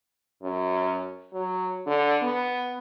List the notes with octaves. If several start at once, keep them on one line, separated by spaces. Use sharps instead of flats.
F#2
F#3
D3
B3